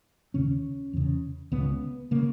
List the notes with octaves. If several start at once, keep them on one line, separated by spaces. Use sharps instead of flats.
D#2 C#3 C#4
E2 C#3
C#2 C#3 B3
C#3 A#3